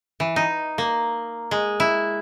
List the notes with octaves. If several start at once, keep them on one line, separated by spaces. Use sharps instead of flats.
E3
D#4
A#3
G#3
E4